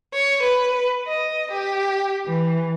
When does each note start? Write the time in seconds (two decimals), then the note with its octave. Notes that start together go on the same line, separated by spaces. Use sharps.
0.14 C#5
0.44 B4
1.07 D#5
1.51 G4
2.27 E3